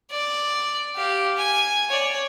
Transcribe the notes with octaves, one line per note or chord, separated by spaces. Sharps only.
D5
G4 F5
G#5
C#5 D5